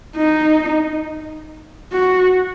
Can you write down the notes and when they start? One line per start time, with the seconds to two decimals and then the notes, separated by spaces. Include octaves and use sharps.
0.16 D#4
1.92 F#4